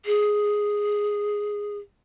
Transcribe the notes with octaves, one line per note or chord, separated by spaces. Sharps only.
G#4